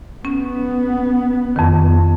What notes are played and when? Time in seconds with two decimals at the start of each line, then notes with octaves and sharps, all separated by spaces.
0.25 B3 C#4
1.56 F2 D#3